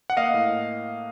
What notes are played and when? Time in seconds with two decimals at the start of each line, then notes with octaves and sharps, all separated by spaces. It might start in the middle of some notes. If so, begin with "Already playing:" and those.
0.10 F#5
0.17 A#3 D#5 F5
0.34 A2